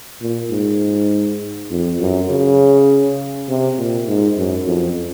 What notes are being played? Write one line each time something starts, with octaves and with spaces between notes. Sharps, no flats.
A#2
G#2
F2
F#2
C#3
C3
A#2
G#2
F#2
F2